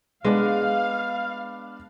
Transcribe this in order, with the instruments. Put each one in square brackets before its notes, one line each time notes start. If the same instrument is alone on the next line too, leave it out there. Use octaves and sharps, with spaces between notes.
[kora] G#3 [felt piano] B3 D4 [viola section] F5